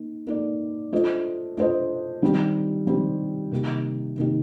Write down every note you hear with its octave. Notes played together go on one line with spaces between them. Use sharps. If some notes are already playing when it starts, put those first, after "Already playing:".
Already playing: A#3 D#4
A#3 D#4 A4 D5
A3 D4 F4 C5 D#5
A3 D4 F4 C5 D#5
D#3 G3 C4 G4
D#3 G3 C4 G4
C3 D#3 A#3 D#4 G4
C3 D#3 A#3 D#4 G4